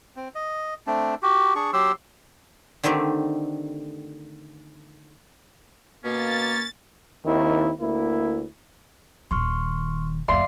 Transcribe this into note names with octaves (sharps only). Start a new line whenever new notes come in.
C4
D#5
A3 C4 D4
F#4 G4
D4 G#4 C#6
F#3 G4 C6 E6
D3 D#3 A3 C4 G4
B2 A#3 C#4 A6
D#2 D#3 C4 E4
D2 A#3 E4
D#1 D#3 C6 C#6 F6
F#1 D2 D5 E5 F5 C6